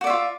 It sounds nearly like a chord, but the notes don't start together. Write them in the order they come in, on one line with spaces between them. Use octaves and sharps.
F#4 D5 E5 F4